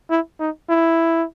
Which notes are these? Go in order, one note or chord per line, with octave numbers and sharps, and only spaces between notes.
E4
D#4
E4